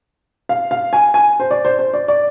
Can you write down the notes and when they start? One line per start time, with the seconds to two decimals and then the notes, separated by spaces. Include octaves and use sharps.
0.49 F5
0.71 F5
0.93 G#5
1.14 G#5
1.40 C5
1.51 D5
1.65 C5
1.79 C5
1.94 D5
2.08 D5